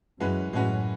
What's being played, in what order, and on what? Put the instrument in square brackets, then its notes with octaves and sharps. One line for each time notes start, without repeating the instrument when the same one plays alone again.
[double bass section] F#2 [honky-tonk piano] E3 G#3 C#4 F#4 B4
[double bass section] F#2 A2 [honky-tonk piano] E3 G#3 C#4 F#4 B4